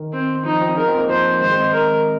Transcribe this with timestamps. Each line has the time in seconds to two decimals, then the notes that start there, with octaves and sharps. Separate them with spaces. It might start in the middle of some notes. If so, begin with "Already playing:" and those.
Already playing: D#3
0.13 C4
0.45 F3 D#4
0.61 C4 F4
0.77 D#4 G#4 A#4
0.88 C4 F4
0.98 A#3 D#4
1.09 F3 C5
1.41 D#3 G#3 C5
1.51 G#3 C4
1.73 A#4